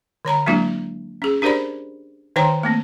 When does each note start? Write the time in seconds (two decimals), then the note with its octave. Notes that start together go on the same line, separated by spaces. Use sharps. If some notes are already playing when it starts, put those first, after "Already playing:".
0.25 D3 C#5 A#5 B5
0.46 F#3 G#3 A#3 D4 E4 F#4
1.22 C#4 G#4
1.42 D4 G4 A#4 C5 D5 B5
2.36 D#3 D#4 C5 C#5 G5 A#5
2.63 A3 A#3 C4